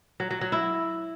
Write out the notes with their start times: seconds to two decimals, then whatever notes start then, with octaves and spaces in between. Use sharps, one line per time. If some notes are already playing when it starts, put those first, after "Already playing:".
0.20 F#3
0.31 F#3
0.41 F#3
0.52 E4